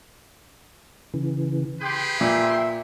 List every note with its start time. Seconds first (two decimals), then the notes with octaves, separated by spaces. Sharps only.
1.14 C#3 E3
1.81 G4 G#4 B4 G5 C6
2.21 A#2 E5